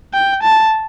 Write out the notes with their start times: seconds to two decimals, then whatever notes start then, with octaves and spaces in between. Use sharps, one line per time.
0.13 G5
0.43 A5